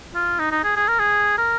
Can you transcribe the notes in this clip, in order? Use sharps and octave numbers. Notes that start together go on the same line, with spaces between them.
F4
D#4
D#4
G#4
G#4
A#4
G#4
A#4